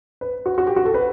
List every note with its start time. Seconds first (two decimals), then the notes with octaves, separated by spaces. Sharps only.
0.21 B4
0.46 F#4
0.58 F#4
0.67 G4
0.76 F#4
0.85 A4
0.94 B4